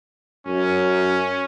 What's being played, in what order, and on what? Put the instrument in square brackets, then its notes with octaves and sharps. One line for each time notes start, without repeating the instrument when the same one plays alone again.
[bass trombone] F#2 [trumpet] C#4